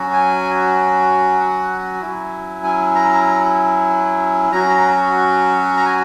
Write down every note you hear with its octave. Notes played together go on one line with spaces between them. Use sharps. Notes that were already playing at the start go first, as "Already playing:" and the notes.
Already playing: F#3 C#4 F#4
G#5
F#5
F#3 C#4 E4
G#5
A#5
F#3 C#4 F#4 A#5
A#5
G#5